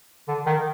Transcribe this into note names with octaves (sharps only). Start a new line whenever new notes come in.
D3
D#3